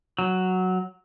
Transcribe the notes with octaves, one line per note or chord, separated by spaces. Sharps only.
F#3